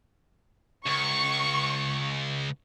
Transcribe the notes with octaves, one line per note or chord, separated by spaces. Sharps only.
C#2 C#6